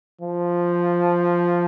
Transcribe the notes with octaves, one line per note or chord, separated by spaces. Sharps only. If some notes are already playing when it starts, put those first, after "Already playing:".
F3